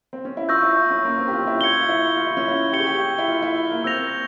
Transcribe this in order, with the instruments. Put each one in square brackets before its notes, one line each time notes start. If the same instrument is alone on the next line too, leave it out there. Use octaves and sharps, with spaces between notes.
[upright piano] C4
C#4
E4
[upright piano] F4 [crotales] C#6 E6 G6 A#6
[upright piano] E4
E4
C#4
A#3
C4
G4
F4
C#4
E4
[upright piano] F4 [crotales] G#6 C#7 G7
[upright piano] F4
E4
F4
E4
C#4
E4
[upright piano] G4 [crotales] C#6 G6 C#7 G7
[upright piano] G#4
G4
E4
F4
E4
A#3
[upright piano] C4 [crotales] E6 G6 A#6 F7